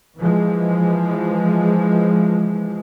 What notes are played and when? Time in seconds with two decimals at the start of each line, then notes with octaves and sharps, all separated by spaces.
0.17 E3 F3 G#3